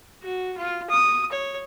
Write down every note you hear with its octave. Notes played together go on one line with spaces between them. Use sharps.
F#4
F4
D#6
C#5